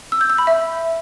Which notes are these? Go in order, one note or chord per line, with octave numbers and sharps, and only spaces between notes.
E6
G6
E6
B5
E5